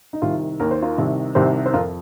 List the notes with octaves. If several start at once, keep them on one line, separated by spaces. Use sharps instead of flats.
D#4
C2 C3 D#3 F4
D#2 D#3 A#4
C5
F4 A#4
C2 C3 D#3
C2 C3 D#3 G4 C5
C5
F2 F3 F4 A#4